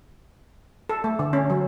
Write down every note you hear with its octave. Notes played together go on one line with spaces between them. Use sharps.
A4
A3
D3
C#4
F#3